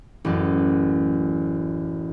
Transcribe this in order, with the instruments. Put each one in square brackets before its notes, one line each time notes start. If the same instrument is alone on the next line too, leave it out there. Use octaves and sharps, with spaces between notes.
[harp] A1 F#2